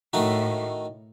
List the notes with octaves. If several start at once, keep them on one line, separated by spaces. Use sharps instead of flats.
A2 D#3 A3 D#4 F#4